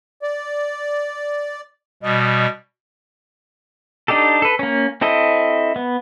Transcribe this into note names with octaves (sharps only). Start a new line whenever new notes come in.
D5
B2 G3 D#5
D4 D#4 G4 A4
A4 B4
A#3 C#4
C4 E4 A4 D#5
B3